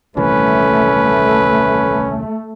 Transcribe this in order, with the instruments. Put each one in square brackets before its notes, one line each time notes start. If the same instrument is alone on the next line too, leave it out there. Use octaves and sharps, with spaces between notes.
[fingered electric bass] D#1 C2 E3 [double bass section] A3 [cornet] C#4 [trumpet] B4